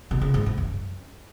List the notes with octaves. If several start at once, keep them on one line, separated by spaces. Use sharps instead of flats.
B2
C#3
G#2
G#2
F#2